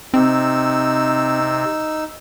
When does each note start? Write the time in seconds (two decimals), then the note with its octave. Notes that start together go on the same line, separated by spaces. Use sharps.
0.14 C3 C4 D#4 E6